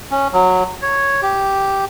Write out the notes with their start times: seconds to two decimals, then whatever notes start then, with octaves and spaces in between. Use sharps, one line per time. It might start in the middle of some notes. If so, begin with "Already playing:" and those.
0.11 C#4
0.33 F#3
0.82 C#5
1.22 G4